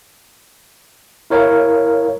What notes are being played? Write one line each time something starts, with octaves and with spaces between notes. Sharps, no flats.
E4 A#4 C#5 F5